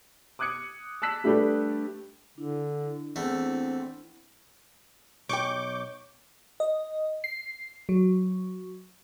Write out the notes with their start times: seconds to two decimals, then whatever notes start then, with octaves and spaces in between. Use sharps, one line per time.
0.39 D6 D#6 F#6 G#6 C#7
1.02 A5 E6 F#6 B6 E7
1.24 G3 A3 D4 G4 A4 B4
2.38 D3 D4 E4
3.16 E2 A3 C4
5.29 B1 G5 C#6 D6 G6
6.60 D#5
7.24 C7
7.89 F#3